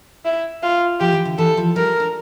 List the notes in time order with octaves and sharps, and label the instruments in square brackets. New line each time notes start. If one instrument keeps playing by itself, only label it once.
[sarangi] E4
F4
[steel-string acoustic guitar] F3 [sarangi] G4
[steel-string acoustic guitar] E3
D3
[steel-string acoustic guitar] E3 [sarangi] A4
[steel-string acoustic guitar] F3
[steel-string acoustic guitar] G3 [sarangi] A#4
[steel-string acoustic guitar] D4